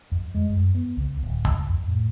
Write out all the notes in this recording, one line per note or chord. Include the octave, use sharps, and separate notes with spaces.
F2
G#3
F#2
B3
C#2
D1
C#2
F2
A2